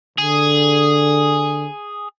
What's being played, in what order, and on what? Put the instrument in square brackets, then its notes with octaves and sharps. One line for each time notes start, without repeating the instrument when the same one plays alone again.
[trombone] D3 [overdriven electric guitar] G#4